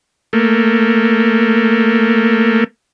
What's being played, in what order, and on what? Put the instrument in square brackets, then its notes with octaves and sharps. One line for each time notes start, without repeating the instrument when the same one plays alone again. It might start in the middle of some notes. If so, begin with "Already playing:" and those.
[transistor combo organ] A3 A#3